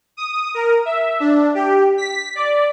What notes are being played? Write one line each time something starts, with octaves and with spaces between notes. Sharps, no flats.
D#6
A#4
E5
D4
G4
B6
D5